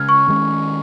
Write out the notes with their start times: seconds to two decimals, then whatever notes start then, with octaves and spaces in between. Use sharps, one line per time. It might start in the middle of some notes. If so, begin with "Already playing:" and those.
Already playing: C#3 G#3 C#4 F6 G#6
0.09 C#6
0.28 D#3 G#3 C#4